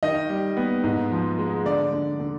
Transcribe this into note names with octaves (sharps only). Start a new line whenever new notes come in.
D#3 D#5
G3
B3
G#2
F3
G#3
D3 D5
D3
D3